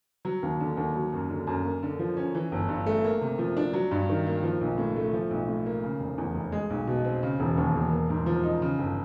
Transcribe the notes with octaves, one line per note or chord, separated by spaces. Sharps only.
F#3
D#2
D3
D#2
F#3
F#2
D3
F#2
A#3
D3
F3
C#4
E3
G1
G2
A3
A#3
C3
F3
D4
F#3
G2
D#3
A#3
F3
B1
A2
A3
F3
B1
A2
A#3
C#3
F1
E2
F1
G#3
B1
B2
C4
C#3
E1
D#2
E1
A#3
G#2
F3
D#4
C#3
G1